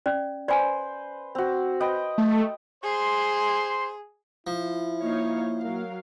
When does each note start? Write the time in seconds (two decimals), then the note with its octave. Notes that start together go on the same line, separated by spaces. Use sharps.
0.06 C#4 D5
0.48 B4 C5 D5 G#5
1.35 C4 F#4
1.80 B4 D#5 G5
2.18 A3
2.84 G#4 C5 C6
4.47 F3 E4
5.02 A#3 D#4 C#5 F5
5.59 F#3 A#4 F5